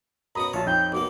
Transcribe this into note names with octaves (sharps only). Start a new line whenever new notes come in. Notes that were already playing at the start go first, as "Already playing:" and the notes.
F#2 B2 F#4 A#5 B5 D#6
A#1 F4 C#5 A5
F2 D#4 G5 G6
B1 B2 A#3 D6